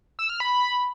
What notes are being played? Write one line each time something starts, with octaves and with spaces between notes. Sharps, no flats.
E6
F6
B5